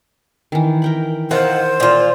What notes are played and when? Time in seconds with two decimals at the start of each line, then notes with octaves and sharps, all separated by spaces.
0.52 D#3 E3
0.82 A#4 G5 B5
1.31 D#3 F4 A#4 C5 F#5
1.80 A#2 F4